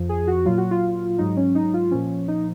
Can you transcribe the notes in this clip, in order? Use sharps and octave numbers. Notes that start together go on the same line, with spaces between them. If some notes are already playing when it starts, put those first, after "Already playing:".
Already playing: F2 F3
G#4
F#4
A#2 F#3 F4
F#4
F4
G#2 F#3 D#4
C#4
D#4
F4
A#2 F3 C#4
D#4